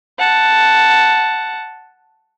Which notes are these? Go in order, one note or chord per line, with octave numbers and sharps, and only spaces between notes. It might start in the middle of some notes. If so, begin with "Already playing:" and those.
F#5 A5